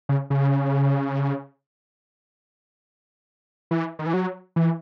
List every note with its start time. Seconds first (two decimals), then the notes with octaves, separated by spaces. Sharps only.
0.09 C#3
0.30 C#3
3.71 E3
3.99 D#3
4.06 E3
4.14 F#3
4.56 E3